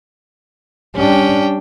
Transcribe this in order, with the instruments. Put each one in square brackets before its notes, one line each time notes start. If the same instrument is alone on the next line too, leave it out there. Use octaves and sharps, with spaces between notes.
[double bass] G3 D4 [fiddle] C#4 G5